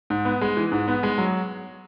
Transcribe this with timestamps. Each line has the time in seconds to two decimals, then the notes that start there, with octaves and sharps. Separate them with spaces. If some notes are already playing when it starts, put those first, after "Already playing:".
0.10 G#2
0.25 B3
0.41 G#3
0.57 E3
0.72 G#2
0.88 B3
1.03 G#3
1.18 F#3